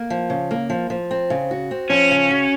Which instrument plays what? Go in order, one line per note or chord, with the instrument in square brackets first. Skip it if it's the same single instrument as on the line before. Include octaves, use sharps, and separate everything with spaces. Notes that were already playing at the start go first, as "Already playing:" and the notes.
Already playing: [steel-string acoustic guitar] A#3
F3
C#3
A#3
F3
F3
C4
C#3
F#4
C4
[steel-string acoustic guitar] F3 [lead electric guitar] C#4
[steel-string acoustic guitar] C#3
F#4